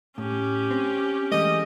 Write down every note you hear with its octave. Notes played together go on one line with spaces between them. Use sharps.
A2 C#4 G4
C4
E3 G#3 A3 D#5